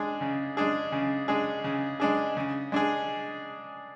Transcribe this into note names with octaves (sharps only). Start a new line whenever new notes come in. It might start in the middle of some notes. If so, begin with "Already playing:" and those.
Already playing: G#3 D4 G#4
C#3
G#3 D4 G#4
C#3
G#3 D4 G#4
C#3
G#3 D4 G#4
C#3
G#3 D4 G#4